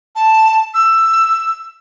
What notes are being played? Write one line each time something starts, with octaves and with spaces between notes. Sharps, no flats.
A5
E6